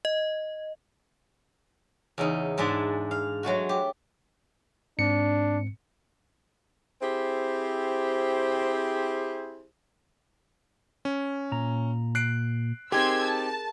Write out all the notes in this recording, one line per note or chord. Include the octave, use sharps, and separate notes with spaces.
D#5
E2 C#3 D#4
G#2 G#3 D4 E5 A5 A#5
F5
F#3 G#3 A3 F#4
G4
G#2 C4 D4 C#7
C4 E4 G4 G#4 C5
C#4
A#2 A#5
F#6 C7 D7
C4 D#4 G4 G#4 A#4 C6 E6 G#6
A5